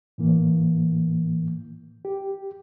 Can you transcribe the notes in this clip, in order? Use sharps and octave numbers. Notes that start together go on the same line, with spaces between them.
A2 E3 A#3
G4